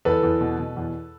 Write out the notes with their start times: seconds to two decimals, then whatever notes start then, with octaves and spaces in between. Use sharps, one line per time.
0.05 E2 A4 B4
0.23 E2
0.41 B2
0.59 B2
0.77 E2